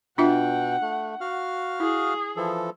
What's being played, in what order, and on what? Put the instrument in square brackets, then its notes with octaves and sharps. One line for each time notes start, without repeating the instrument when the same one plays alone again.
[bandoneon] B2 G5 [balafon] D4 F4 E5 [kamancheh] F#5
[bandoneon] A3
F#4 F5 F6
[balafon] E4 [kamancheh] G#4
[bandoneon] E3 F3 A4